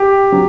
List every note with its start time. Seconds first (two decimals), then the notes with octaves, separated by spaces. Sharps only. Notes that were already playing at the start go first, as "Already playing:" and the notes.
Already playing: G4
0.32 F#3